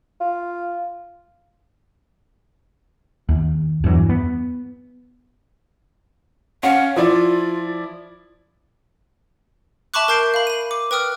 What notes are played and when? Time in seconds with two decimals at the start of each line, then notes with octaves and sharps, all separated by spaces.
0.21 F4
3.29 D#2
3.84 E2 G2 E3 F#3
4.09 B3
6.63 C#4 C#5 F5 F#5
6.96 F3 E4 F4 D5
9.94 E5 A5 B5 C#6 D6 F#6
10.08 A#4 A5 G6 C7 D7
10.34 F5 B5
10.47 B5 D#7
10.71 D6
10.91 B4 G5 D#6 F6